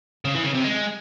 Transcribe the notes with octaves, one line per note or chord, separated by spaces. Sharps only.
C#3
E3
C#3
C3
G#3